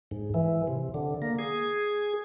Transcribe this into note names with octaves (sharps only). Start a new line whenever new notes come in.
G#2
E3
C3
D3
A#3
G#4